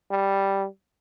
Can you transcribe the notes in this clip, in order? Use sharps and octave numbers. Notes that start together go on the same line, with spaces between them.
G3